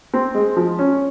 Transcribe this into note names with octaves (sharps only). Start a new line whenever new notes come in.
C4
G#3
F3
C#4